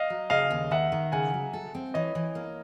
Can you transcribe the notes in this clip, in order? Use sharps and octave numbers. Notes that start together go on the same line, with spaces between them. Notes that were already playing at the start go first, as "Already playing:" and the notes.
Already playing: D#5 F5
F#3
C#3 D#5 F5
D#2
D#3 E5 F#5
D#3
C#3 F#5 G#5
F#3
A4
C4
E3 C#5 D#5
E3
A#3